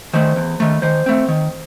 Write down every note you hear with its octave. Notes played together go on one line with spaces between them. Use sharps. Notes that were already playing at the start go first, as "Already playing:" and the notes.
D#3 A3 C5
E2
D#3 A3
D#3 C5
A3 C4
D#3